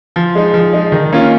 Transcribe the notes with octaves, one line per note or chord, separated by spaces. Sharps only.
F3
G#3 D#4
F3
G#3 D#4
D#3
A#3 C#4 F4